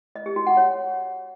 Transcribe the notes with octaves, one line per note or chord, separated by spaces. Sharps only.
D#5
G4
F#4
F#5
C#5